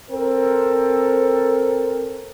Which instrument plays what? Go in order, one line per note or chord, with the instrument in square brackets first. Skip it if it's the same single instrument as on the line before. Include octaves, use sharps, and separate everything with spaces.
[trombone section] C4 A4 A#4